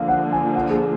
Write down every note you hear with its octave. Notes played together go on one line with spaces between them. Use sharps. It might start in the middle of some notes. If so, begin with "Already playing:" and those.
Already playing: D3 F3 A#3 F5
F#5
G#5
F#5
G#4